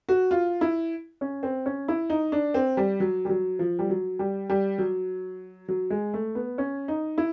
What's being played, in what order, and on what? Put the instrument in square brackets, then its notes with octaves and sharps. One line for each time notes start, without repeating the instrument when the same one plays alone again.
[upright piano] F#4
F4
E4
C#4
C4
C#4
E4
D#4
D4
C4
G3
F#3
G3
F#3
F3
G3
F#3
G3
G3
F#3
F#3
G#3
A3
B3
C#4
D#4
E4